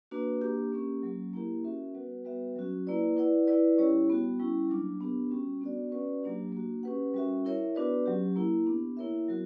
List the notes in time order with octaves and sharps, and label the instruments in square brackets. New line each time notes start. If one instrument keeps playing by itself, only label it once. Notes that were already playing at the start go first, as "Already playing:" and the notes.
[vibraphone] A#3 D4 F#4 B4
A#3 D4 G4
A#3 C#4 G4 A#4
F#3 A#3 C#4
A#3 E4 G4 A#4
C#4 F#4 A#4 E5
G3 B3 F#4 B4 F#5
G3 B3 F#4 B4 E5
F#3 C#4 F#4
A#3 E4 B4 D5
E4 B4 D5 F#5
E4 B4 D5
G3 C#4 E4 G4 C#5
G3 B3 F#4
G3 C#4 E4
F#3 A#3 D4
B3 D4 G4 A#4
G3 C#4 F#4
B3 D4 F#4 A#4 D5
C#4 F#4 B4 D5 F#5
F#3 A#3 D4 G4
A#3 D4 F#4
C#4 G4 B4 F#5
G3 C#4 F#4 A#4 E5
E4 A#4 C#5 E5
B3 D4 F#4 B4 D5
F#3 C#4 G4
A#3 E4 A#4
B3 D4 G4
A#3 E4 A#4 C#5 E5
F#3 B3 F#4 A#4